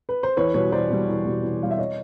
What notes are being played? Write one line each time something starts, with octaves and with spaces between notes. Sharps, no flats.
B4
C5
E2 B4 C#5
B2 G3 B4 C#5
E2 C5 D5
B2 G3
E2
B2 G3
E2
B2 G3 F5
E5
C#5 D#5